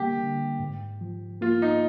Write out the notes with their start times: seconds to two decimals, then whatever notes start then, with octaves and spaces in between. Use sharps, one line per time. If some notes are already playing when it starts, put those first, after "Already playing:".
Already playing: D3 G3 A#3 G4
0.19 D3
0.59 G#2
1.01 F3
1.41 A#3 F4
1.62 D#4